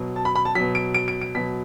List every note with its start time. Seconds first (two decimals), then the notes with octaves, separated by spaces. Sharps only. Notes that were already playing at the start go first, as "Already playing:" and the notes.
Already playing: B2 F#3
0.16 A5
0.25 B5
0.35 B5
0.45 A5
0.55 F#3 B6
0.60 B2
0.75 D7
0.94 D7
1.08 D7
1.21 D7
1.35 B2 F#3 B6